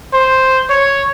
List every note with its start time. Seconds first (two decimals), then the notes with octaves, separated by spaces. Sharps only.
0.14 C5
0.70 C#5